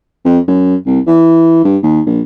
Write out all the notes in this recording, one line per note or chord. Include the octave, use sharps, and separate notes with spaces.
F2
F#2
C2
E3
G2
D#2
A#1